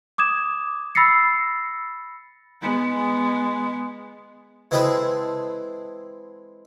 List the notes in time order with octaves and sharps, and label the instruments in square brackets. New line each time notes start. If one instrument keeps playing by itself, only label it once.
[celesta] D6 D#6 G#6 E7
B5 E6 A6 A#6 C7 C#7
[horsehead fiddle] G#3 B3
[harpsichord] E3 G#3 C4 G#4 A4 B4